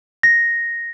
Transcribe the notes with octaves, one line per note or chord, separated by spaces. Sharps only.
A#6